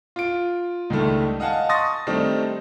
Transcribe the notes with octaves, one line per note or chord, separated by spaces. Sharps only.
F4 D7
C#2 G2 D#3 A3
D#5 F5 F#5 G#5 A5
C6 C#6 D#6 A6 A#6
D#3 G3 A3 C4 D4 D#4